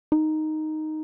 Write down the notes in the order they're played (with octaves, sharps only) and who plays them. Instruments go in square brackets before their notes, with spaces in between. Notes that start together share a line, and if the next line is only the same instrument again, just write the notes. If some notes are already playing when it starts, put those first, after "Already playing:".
[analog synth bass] D#4